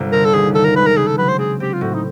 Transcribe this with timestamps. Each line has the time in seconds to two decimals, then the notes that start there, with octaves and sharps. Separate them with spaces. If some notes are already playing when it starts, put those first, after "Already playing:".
Already playing: G1 C3
0.12 D3 A#4
0.25 A4
0.33 D#2 G#4
0.54 D#3 A4
0.65 A#4
0.76 G#3 B4
0.86 A#4
0.96 C#3 G#4
1.07 A4
1.18 F#3 B4
1.28 C5
1.39 C4 G#4
1.60 C4 G4
1.73 F4
1.81 A2 F#4
1.94 D#4